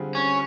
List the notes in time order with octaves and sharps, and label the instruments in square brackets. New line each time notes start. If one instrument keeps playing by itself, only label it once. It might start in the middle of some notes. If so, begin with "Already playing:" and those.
Already playing: [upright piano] D3 G3 C4 F4 G#4
[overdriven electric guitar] C#4